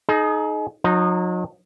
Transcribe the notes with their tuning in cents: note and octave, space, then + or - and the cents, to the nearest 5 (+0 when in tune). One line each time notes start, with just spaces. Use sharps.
D#4 +0 G#4 +40
F#3 -40 D#4 -15